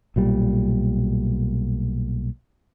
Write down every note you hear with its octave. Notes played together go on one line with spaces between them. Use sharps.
B1 A#2 G3